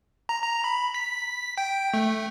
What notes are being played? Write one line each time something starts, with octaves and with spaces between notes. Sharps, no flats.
A#5
A#5
B5
B6
G5
A3